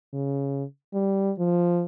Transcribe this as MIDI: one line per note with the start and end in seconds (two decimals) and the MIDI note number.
0.13 0.64 49
0.94 1.32 55
1.38 1.86 53